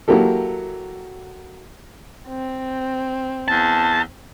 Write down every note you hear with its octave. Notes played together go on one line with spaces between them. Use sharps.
F#3 A#3 E4 G4 A4
C4
E2 A5